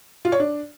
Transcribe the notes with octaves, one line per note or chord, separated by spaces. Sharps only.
F4
C#5
D4